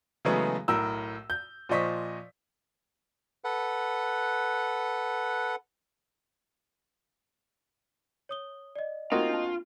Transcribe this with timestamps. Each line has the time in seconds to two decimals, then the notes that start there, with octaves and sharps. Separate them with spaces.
0.25 C#3 E3 F#3 G#3 A3 B3
0.68 B1 A2 A#4 E6
1.30 G6
1.69 A#2 F3 C5 D#5 C#6 B6
3.44 A4 B4 F#5
8.29 C#5 D#6 G7
8.76 D5 D#5
9.12 A#3 C4 D#4 F4 F#4 A#4 D#5
9.29 D4 A5